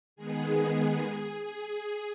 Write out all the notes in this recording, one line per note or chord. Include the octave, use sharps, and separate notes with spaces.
D#3 G#3 B3 G#4
G#4